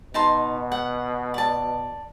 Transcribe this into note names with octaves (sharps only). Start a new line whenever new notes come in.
B2 D#4 A5 C6
F#5
D5 A5